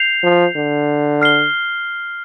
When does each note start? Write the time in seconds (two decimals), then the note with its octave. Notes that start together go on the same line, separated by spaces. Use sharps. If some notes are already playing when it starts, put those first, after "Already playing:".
Already playing: G6 C7 F7
0.23 F3
0.55 D3
1.22 F6 C7 G7